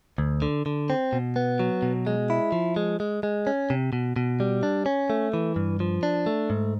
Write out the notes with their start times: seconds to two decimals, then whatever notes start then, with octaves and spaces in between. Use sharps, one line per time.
0.18 D2
0.42 D3
0.66 D3
0.90 C4
1.13 B2
1.36 B3
1.60 F#3
1.83 B2
2.07 G#3
2.30 E4
2.52 F3
2.76 G#3
3.00 G#3
3.23 G#3
3.47 C#4
3.70 C3
3.93 B2
4.16 B2
4.40 G3
4.63 D4
4.86 C#4
5.10 A3
5.34 E3
5.56 G2
5.80 F3
6.03 D4
6.26 A3
6.50 G#2